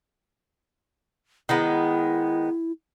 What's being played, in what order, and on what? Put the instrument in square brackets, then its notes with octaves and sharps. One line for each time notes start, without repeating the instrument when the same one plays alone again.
[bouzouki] D#3 G#3 B3 [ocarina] E4